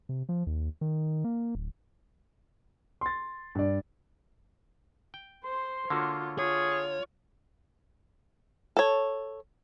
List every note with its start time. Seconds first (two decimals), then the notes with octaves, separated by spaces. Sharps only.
0.09 C3
0.29 F3
0.47 D#2
0.81 D#3
1.24 A#3
1.55 D1
3.01 C6 A6
3.55 G2 D5
5.14 G5
5.44 C5 C6
5.90 D3 A#3 F4 F#4 C#5
6.39 F4 G#4 C#5
8.77 A4 C#5